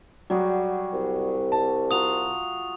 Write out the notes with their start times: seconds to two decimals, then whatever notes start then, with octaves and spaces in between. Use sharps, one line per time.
0.30 F#3 G3 F#4 G#4
0.93 C2
1.52 A5
1.91 F4 F#4 A#5 D#6 F7